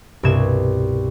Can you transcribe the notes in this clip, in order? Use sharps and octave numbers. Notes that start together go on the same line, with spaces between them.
C2 G2 B2 A#4 G#6 E7